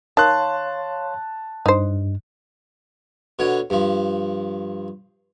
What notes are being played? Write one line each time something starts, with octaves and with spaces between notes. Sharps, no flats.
D#3 C#5 F5 A5 C6 F#6
G2 D#4 C5
B2 D3 C#5
G2 F3